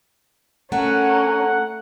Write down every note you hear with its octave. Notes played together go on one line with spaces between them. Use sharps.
A3 C#4 A#4 F#5